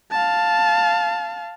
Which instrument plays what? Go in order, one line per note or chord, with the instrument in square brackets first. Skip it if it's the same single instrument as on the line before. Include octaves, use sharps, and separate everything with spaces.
[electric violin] F5 A5